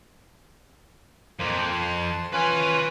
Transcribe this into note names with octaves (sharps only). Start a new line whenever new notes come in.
F2 F3 A#3 C5
A5 C6
C#4 F4 B4 G#5